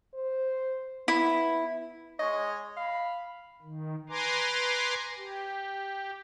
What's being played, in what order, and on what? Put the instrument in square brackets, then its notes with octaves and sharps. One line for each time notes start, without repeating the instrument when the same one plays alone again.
[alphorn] C5
[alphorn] B3 [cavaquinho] E4
[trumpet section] G#3 C#5 [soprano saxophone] D#5
[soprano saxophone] F5 [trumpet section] B5
[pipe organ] D#3
B4 G#5 A#5 C6 D6
G4